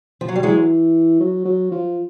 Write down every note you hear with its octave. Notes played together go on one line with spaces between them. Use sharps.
F3
F#3
G3
E3 F#3 G#3
F#3
F#3
F3